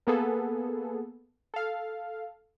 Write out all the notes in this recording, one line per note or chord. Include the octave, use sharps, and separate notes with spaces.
A#3 B3 G#4 A4
A4 F5